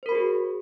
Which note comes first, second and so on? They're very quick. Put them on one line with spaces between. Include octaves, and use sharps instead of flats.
C5 A#4 B5 F#4 G#4